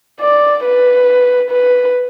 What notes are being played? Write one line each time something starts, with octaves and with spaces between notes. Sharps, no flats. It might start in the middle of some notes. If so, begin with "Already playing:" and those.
D5
B4
B4